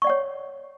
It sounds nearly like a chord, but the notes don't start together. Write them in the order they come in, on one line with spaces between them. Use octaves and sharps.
C#6 D5 F#5 C#5